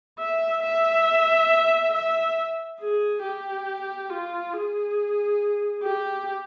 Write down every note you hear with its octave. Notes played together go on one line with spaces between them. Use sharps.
E5
E5
E5
G#4
G4
F4
G#4
G4